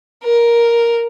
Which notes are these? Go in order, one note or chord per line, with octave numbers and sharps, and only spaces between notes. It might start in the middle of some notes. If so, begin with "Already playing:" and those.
A#4